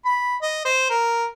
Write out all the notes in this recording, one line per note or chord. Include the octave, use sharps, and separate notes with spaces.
B5
D#5
C5
A#4